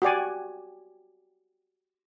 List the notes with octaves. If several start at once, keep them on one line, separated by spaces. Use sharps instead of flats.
F#4 G4 D5 G#5